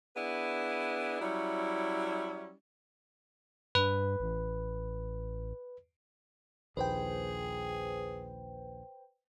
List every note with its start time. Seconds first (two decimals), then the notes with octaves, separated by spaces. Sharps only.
0.16 B3 D4 E4 G#4 B4
1.21 F#3 G3 C#4 E4
3.75 G2 B4
4.20 A1
6.77 A#1 D#2 G#4 B4 C5 G5